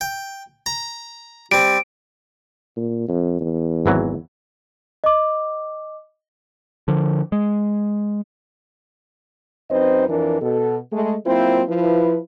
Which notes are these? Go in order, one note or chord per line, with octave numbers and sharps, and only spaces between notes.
G5
A#5
G3 C4 D7
A#2
F2
E2
G#1 E3 F#3
D#5 D6
D3 F3
G#3
F#2 C4 D#4 B4 C5 D#5
F2 E3 D4 A#4
B2 A4
G#3 A3
F#3 A#3 C4 E4 F4 C5
F3 E4 B4